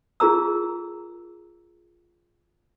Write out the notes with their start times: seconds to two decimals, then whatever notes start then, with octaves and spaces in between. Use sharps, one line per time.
0.20 F4 G#4 A#4 A#5 E6